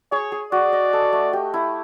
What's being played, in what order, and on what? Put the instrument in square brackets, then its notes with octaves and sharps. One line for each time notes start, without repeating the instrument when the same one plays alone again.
[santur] G#4 [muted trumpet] C#5
[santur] G#4
[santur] F#4 [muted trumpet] D5
[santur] D#5
A4
A3
G4
E4